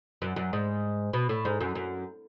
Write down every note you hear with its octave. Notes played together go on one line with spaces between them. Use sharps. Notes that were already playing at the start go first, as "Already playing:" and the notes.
F#2
F#2
G#2
B2
A2
G#2
F#2
F#2